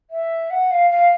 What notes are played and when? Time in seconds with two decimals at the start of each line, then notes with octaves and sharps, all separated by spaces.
0.10 E5
0.50 F#5
0.71 F5
0.91 F5